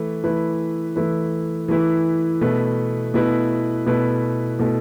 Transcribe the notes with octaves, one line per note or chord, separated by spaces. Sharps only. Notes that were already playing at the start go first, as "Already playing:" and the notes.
Already playing: E3 A3 E4 B4
E3 A3 E4 B4
E3 A3 E4 B4
E3 A3 E4 B4
B2 A3 E4 B4
B2 A3 E4 B4
B2 A3 E4 B4
B2 A3 E4 B4